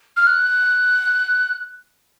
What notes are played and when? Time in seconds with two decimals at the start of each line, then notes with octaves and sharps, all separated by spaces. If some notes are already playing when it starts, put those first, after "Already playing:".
0.16 F6
0.27 F#6